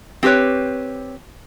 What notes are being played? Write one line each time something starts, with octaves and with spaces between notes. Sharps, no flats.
C4 G4 G#4 B4 C#5